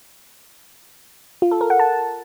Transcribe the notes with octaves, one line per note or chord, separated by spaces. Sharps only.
F4
A4
A#4
F#5
A5